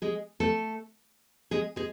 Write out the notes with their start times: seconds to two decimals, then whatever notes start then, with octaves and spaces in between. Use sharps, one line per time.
0.02 G#3 G#4
0.40 A3 A4
1.51 G#3 G#4
1.76 G#3 G#4